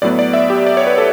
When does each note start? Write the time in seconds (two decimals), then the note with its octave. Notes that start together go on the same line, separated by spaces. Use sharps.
0.02 A2 F#3 B3 D5
0.19 D5
0.33 E5
0.50 G4
0.66 D5
0.77 C#5
0.87 B4
0.98 A4